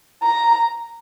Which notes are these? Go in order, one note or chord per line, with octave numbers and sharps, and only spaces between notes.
A#5